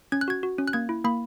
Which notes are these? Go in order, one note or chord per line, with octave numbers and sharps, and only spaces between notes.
C#4 G#6
F#6
F#4 G#6
F#4
C#4
F#6
A#3 G#6
E4
A#3 B5